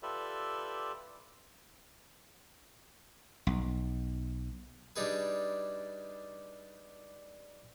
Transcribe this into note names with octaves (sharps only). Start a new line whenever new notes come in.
F4 G4 A4 B4 D5 E5
B1
G3 D4 D#4 G#4 B4